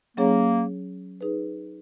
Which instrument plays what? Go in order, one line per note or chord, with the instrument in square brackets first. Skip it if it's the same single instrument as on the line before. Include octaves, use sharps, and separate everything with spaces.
[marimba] F#3 C#4 G#4 C#5 [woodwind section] A#3
[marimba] D#4 G#4 B4